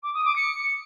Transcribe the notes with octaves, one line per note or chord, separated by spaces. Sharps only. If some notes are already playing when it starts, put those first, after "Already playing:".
D6
D#6
D6
C#7